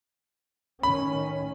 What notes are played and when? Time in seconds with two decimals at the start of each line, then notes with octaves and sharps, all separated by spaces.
0.83 A2 D#3 C#4 B5